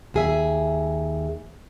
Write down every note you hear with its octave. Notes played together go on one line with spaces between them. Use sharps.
D#2 G#4 E5